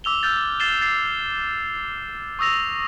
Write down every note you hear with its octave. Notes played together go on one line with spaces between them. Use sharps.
D6 E6 F7 G7
E6 F6 G6 A6
A6 C7 E7 G7
A6 C7
C#6 D#6 E6 A#6 F7